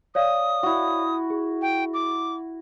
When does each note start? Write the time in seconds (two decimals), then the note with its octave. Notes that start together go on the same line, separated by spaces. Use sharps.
0.15 C#5 D5 F5 D#6
0.63 E4 F#4
1.30 G#4
1.62 G5
1.94 D6